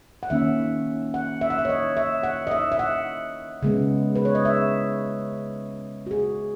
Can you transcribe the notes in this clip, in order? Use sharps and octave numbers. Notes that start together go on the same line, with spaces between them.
F#5
D#3 A#3 C#4 E5
F#5
E5
F#5
E5
C#5
D#5
E5
F#5
D#5
E5
E5
F#5
C#3 G#3 B3
B4
C#5
D#5
E5
F#4
G#4